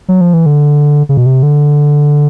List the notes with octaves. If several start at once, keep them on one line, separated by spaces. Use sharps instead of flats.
F#3
F3
E3
D3
C#3
B2
C3
D3